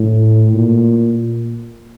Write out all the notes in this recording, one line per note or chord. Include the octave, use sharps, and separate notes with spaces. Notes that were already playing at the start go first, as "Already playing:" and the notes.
Already playing: A2
A#2